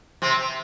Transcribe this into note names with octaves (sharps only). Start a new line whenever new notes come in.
C3 C4